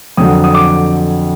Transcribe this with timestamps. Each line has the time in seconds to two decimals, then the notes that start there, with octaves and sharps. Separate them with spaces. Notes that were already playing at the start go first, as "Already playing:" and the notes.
0.17 F2 D3 F#3 D#6
0.44 D#6
0.54 D6